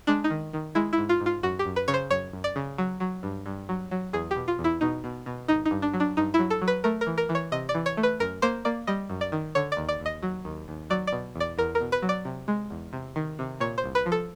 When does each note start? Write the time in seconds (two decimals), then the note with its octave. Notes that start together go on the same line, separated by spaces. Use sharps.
0.07 G#3 D4
0.24 D#4
0.30 D#3
0.53 D#3
0.75 G#3 E4
0.93 E4
0.98 G#2
1.09 F4
1.20 G#2
1.26 F4
1.43 F#2 F#4
1.59 G4
1.65 F#2
1.76 B4
1.88 C#3 C#5
1.94 C5
2.10 F#2 C#5
2.33 F#2
2.44 D5
2.56 C#3
2.78 F#3
3.00 F#3
3.23 G2
3.46 G2
3.69 F#3
3.91 F#3
4.13 E2 G#4
4.31 G4
4.36 B2
4.48 F4
4.59 E2
4.64 E4
4.81 B2 D#4
5.04 B2
5.26 B2
5.48 G#1 D#4
5.65 D#4
5.71 G2
5.82 D4
5.94 F#3
6.00 D4
6.17 G2 D#4
6.34 E4
6.39 F#3
6.50 A4
6.62 F#3
6.68 B4
6.84 A3 A#4
7.01 A#4
7.06 E3
7.18 A#4
7.29 E3
7.35 C#5
7.52 C3 D#5
7.69 D5
7.75 E3
7.86 C#5
7.97 A3
8.03 B4
8.20 F#2 A#4
8.42 A#3 C5
8.65 A#3 D5
8.87 G3 D#5
9.10 F#2
9.21 D5
9.32 D#3
9.55 D3 C#5
9.72 D5
9.77 D#2
9.89 D5
10.00 D#2
10.06 D#5
10.23 F#3
10.45 D#2
10.68 D#2
10.90 F#3 D5
11.07 D5
11.13 B2
11.35 E2 D5
11.58 E2 A#4
11.75 A#4
11.81 B2
11.92 B4
12.02 F#3
12.09 D5
12.25 C3
12.48 G#3
12.70 E2
12.93 C3
13.16 D#3
13.39 C3
13.60 A#2 C#5
13.78 C5
13.84 C2
13.95 B4
14.06 F3
14.12 A4